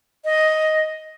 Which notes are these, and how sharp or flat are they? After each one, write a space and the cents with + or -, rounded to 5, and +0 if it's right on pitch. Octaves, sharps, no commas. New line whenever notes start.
D#5 +5